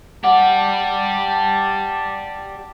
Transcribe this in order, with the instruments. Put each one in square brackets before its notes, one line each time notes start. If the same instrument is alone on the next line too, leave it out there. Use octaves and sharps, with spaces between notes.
[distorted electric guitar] G4 D5 [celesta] F#5 [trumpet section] A5